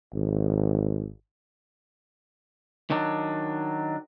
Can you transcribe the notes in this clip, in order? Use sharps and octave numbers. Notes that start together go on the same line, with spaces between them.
G#1
D#3 F#3 D4